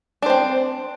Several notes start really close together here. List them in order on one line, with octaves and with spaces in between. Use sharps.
D4 C5 C4